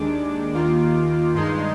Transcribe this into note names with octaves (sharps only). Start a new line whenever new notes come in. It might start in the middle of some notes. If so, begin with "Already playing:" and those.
Already playing: D#2 D#3 G#3 D4 D6
D#2 D#3 A#3 F4
G2 D#3 G#3 D#4 C6